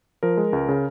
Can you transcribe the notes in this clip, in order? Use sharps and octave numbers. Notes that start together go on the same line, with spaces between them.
F3 A#4
G#3
C#2
C#3